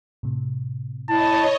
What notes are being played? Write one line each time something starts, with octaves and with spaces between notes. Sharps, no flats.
A2 C3
E4 C#5 D#5 A5